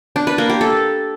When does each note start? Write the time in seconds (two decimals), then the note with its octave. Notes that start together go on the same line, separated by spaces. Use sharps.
0.16 D4
0.27 B4
0.38 A#3
0.50 G4
0.61 A4